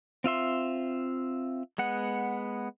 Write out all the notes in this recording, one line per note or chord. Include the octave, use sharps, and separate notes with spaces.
C4 F4 E5 C6
G#3 B3 F#5